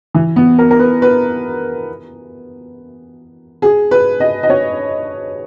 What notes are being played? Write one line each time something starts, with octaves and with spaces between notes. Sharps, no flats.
E3
B3
A#4
A#4
B4
B4
G#4
B4
D#5
D#5
C#5